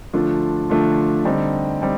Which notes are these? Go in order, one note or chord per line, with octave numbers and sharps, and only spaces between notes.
D3 F3 A3 D4 F4
D3 F3 A3 D4 F4
D3 G3 C4 D#4
G3 C4 D#4